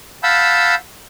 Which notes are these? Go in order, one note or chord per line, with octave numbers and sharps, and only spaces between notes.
F5 F#5 A5 B5 E6 G6